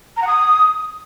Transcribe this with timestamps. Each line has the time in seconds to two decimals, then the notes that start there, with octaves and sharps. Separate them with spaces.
0.17 A#5
0.22 F#5
0.27 D#6